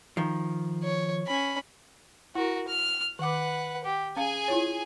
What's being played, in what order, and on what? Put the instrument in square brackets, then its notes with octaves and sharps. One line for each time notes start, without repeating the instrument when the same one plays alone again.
[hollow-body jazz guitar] D#3 F3
[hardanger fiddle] C#5
C#4 B5
[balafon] E4 [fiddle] F#4 A#4
[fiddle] F6
[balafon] D#3 D6 [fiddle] B4 F#5
[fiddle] G4
[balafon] C#4 F5 [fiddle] G#4 G#5
[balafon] E4 F4 C#5